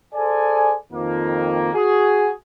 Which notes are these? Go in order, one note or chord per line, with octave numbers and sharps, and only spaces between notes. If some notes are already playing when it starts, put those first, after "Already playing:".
G#4 A4 C5 D5 G#5
F2 D#3 F3 A#3
F#4 G#4